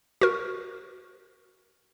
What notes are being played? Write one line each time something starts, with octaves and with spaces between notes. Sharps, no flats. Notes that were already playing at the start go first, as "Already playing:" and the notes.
F#4 A#4